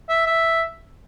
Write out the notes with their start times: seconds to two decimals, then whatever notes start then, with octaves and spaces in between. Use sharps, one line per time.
0.09 E5
0.26 E5